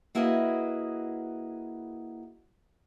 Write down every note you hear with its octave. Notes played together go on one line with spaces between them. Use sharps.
A#3 E4 F#4 G#4 B4 D#5